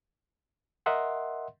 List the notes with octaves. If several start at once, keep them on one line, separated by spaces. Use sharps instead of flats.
A#4 D#5 E5 F#5 C6